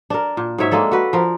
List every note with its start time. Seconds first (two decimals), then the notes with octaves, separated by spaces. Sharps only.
0.10 D4 A#4
0.37 A#2
0.58 G#2 F#3 C#5 E5
0.71 G#3 A#3 D4 A4
0.92 F#4 B4
1.13 F3 A#4